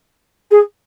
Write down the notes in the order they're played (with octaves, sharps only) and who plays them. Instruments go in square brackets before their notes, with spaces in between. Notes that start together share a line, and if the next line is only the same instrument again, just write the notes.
[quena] G#4